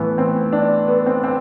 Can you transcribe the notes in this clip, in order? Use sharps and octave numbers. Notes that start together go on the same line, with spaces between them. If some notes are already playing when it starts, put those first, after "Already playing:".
Already playing: A2 E3 B3
C4
D4
B3
C4
C4